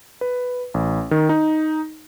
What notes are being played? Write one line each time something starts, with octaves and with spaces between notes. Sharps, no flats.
B4
A1
D#3
D#4